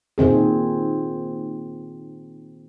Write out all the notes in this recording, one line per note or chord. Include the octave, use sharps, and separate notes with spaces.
A#2 D#3 C4 G#4